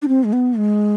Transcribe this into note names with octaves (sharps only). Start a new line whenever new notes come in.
D4
C4
G#3
B3
G#3